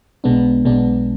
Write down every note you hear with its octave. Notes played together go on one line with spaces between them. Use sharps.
B1 B2 G#3 B3 D4
B1 B2 G#3 B3 D4